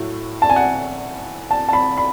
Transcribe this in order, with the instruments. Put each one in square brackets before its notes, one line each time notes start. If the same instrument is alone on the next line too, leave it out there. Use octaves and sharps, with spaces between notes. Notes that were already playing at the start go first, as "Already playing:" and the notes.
Already playing: [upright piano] A2 F#3 A3
A5
G#5
F#5
A5
A5
B5
B5